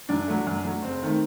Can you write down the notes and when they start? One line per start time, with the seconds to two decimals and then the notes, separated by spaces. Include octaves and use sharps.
0.09 F#2 D4
0.28 F#3 A3
0.47 F#2
0.64 F#3 A3
0.82 F#1 C4
1.03 D#3 A3